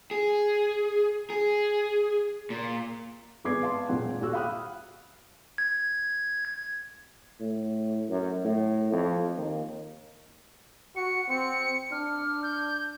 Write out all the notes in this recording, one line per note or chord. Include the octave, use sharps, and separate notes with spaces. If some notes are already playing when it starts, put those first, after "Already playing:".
G#4
G#4
A#2
G#1 G#3 B3 D6 G#6 C7
B4 F5 A5 C6
E1 A#2 F#5 G5
D#1 F#4 E6 F#6
F5 G5 B5 D#6 F6 F#6
G#6
A2
F#2
A2
F2
D#2
F#4 C#7
C4 C#7
D4 F6
G6